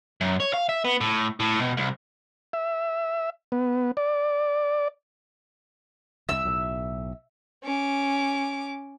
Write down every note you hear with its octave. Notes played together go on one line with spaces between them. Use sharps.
F#2
C#5
F5
E5
B3
A2
A2
B2
C2
E5
B3
D5
C2 C3 E5 E6
B1 A2
C#4 D6